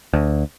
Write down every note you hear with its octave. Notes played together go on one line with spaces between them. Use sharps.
D2